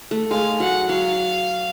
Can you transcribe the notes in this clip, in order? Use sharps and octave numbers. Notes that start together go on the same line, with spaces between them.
A3
G#3 F5
F#3 F#5
F#3 F5